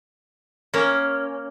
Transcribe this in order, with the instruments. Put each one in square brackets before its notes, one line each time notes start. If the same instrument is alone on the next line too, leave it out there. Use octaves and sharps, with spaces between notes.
[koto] A#3 C#4